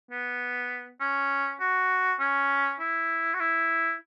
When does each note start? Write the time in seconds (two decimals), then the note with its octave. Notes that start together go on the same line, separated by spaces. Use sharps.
0.11 B3
1.00 C#4
1.61 F#4
2.20 C#4
2.80 E4
3.34 F#4
3.40 E4